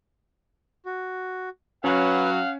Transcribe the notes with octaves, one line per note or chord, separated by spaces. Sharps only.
F#4
F#3 C#4 B4 F5 F#5